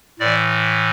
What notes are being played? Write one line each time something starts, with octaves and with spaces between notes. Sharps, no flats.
A2 E3 D5